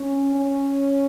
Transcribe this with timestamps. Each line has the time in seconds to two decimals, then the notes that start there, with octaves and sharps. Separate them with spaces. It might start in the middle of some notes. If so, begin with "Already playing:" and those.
Already playing: C#4
0.35 C#4